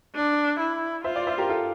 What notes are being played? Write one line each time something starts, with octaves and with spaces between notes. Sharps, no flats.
D4
E4
F4 C5 E5
D5 F5
C5 E5
G4 A#4
F4 A4